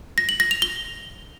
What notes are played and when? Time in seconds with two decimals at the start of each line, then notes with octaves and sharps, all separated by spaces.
0.18 A#6
0.29 F#7
0.40 A#6
0.51 F7
0.62 G7